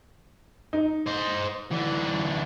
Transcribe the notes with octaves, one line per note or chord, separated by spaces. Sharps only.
D#4
C5 D#5
D3 E3